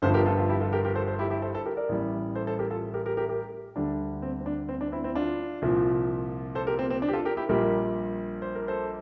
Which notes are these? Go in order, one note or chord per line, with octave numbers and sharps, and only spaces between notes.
G1 G2 D3 F3 A4 C5
G4 A#4
F4 A4
F4 A4
E4 G4
F4 A4
G4 A#4
G4 A#4
A4 C5
A4 C5
E4 G4
E4 G4
A4 C5
A4 C5
G4 A#4
A#4 D5
A1 A2 G3
A4 C5
A4 C5
G4 A#4
F4 A4
G4 A#4
G4 A#4
G4 A#4
G4 A#4
D2 D3 G3 D4
C4
C4
D4
C4
D4
C4 E4
C4 E4
D4 F4
C2 A#2 F3
A4 C5
G4 A#4
C4
C4
D4
G4
F4 A4
G4 A#4
E4 G4
A#1 A#2 G3 G4 A#4
C5
A#4
A4 C5